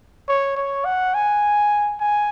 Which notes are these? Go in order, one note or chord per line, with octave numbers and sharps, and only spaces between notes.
C#5
C#5
F#5
G#5
G#5